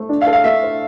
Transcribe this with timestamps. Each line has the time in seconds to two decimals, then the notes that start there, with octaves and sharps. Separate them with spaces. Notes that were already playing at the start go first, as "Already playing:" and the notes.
Already playing: A3 C5
0.09 D4
0.21 F5
0.27 A4
0.33 F5
0.44 A3 E5
0.63 C5